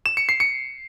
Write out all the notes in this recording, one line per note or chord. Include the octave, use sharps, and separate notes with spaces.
E7
C#7
C7
C#7